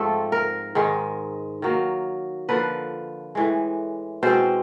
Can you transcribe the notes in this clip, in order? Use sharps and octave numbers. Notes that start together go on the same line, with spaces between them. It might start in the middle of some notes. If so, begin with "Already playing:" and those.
Already playing: G#2 F3 A3 C4 A4
A#4
G#2 D#3 G#3
D#3 F#3 A#3
D3 F3 A#3 B4
A2 E3 G#3
B2 G#3 C4 C5